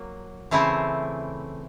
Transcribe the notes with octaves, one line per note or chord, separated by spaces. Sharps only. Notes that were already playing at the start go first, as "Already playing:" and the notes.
Already playing: F#3 A#3
C#3 E3 A3 C4 E4